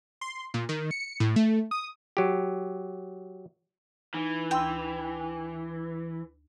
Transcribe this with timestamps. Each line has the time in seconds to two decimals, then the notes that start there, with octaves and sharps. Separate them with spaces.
0.21 C6
0.54 A#2
0.69 D#3
0.91 C#7
1.20 A2
1.36 A3
1.71 D#6
2.17 F#3 G4
4.14 E3 D#4
4.51 D2 G5 C6 E6